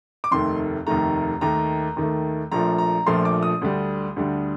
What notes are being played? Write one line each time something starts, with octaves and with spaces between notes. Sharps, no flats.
D6
F1 D#2 D#3 A3 C6
F1 D#2 D#3 A3 A#5
D#2 D#3 A3 A#5
D#2 D#3 A3
A#1 A#2 F3 A3 A#5
A#5
A#1 A#2 F3 A3 C6
D6
D#6
D2 D3 G3
D2 D3 G3